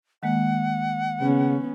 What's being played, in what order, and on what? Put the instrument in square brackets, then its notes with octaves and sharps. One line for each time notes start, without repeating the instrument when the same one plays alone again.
[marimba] D#3 G#3 A#3 [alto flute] F#5
[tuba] C#3 [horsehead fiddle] B3 C#4